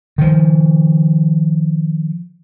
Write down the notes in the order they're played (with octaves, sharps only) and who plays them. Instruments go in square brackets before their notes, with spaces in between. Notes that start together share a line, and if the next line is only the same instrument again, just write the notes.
[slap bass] D#3 F3